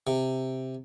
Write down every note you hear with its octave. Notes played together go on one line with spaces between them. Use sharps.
C3